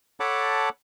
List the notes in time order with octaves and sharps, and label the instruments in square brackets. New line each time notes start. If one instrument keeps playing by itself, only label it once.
[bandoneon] A4 C#5 F#5 A5 B5 D6